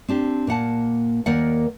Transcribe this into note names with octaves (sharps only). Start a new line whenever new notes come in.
C4 D4 G4
A#2 A#3 F#5 A5
D#2 D#3 A#3 A#4 D5 F#5